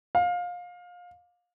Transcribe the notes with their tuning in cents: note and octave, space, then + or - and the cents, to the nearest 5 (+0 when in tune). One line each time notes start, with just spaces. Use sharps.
F5 +25